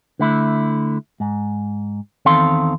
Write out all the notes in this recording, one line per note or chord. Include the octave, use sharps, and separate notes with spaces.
D3 A3 E4
G#2
E2 D#3 C4 A4 F5 C6